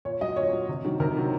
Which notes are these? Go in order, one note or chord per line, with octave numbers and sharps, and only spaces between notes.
A#2 C#5
F#3 D#5
A#2 C#5
F#3
C3
D#3 F#3
C3 A#4
D#3 F#3